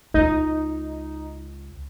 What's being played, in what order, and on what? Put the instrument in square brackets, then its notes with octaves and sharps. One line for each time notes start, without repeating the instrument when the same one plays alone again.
[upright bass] C#2 [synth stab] D#4